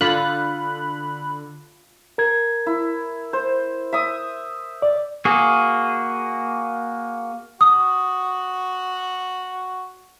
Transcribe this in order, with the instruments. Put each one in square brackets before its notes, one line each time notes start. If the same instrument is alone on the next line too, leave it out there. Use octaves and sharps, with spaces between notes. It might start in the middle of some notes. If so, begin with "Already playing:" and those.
[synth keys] D3 [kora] F4 [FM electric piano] B5 F#6
[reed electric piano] A#4 G#6
[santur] E4
C5
E5 D#6
[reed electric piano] D5
[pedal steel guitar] A#3 F#4 G#4
[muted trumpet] F#4 [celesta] D#6